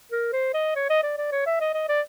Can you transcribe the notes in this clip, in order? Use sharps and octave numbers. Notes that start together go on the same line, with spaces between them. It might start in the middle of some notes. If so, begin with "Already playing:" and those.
A#4
C5
D#5
C#5
D#5
D5
D5
C#5
E5
D#5
D#5
D5